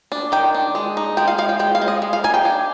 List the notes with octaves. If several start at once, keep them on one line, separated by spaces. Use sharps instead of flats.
D4
D#3 G5
D4
G#3
D#4
G#3 G5
F5
G#3 F5
G5
G#3 G5
F5
G#3
D#5
G#3
F5
D#4 G#5
G5
D4